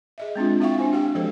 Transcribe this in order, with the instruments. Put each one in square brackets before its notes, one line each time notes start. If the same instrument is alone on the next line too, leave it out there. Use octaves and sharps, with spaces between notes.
[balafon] G#4 D#5 E5
G#3 C4 D4 F4
C4 E4 E5 F5 G5 C#6
D4 C5 G#5
F#4 G4 F5 G5
F3 G#3 G4 A4 C5